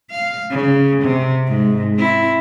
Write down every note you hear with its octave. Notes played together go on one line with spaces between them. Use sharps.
F5
C#3
C3
G#2
C4 E4